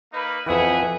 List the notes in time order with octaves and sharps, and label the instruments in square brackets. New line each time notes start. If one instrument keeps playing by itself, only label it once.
[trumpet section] A#3 D#4 B4
[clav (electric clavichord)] F2 E3 [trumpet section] G#4 E5 F#5 [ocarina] B4